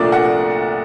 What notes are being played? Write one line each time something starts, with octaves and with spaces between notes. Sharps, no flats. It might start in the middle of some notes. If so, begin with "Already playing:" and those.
Already playing: C2 A#2 F3 A3 D4 D5
F#5